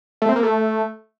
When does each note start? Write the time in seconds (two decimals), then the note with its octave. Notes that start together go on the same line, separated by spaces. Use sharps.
0.22 A3
0.29 C4
0.36 A#3
0.43 A3